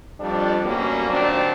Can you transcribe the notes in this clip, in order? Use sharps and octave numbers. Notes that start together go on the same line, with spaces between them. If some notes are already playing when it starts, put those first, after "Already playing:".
F2 G3 D4
F#2 B2 F#3 G3 A#3 C#4
A#2 D#3 F#3 C4 D4